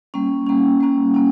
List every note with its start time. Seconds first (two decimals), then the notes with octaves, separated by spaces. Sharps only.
0.14 G3 A#3 C#4
0.46 G3 A#3 C#4
0.80 G3 A#3 C#4
1.14 A#3 C#4